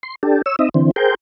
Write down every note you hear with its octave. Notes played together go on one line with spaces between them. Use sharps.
C6
D4 G4 A4
C#5 E6
C4 D#4 D#5 E5
D3 E3 C4
G#4 A#4 C5 G5